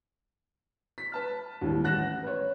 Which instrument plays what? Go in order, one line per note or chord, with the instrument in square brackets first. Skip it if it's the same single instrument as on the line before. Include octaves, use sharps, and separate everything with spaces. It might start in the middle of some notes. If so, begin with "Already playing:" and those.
[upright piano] B6
B4 A5 F6
D#2 A2 G3
A1 F#5 F#6 A#6 E7
B4 C#5